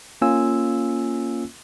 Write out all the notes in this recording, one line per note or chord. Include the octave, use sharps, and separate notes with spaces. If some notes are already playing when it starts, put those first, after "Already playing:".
A#3 C#4 F4 G#5 E6